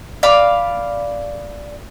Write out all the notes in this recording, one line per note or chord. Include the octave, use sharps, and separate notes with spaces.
D5 F5 B5